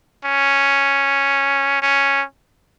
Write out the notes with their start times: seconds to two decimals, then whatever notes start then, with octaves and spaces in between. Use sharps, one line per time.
0.25 C#4
1.82 C#4